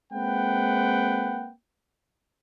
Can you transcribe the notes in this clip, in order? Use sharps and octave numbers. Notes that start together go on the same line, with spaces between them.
G#3 A#3 C4 B4 F#5 G5